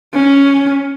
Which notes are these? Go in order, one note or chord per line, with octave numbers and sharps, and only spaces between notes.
C#4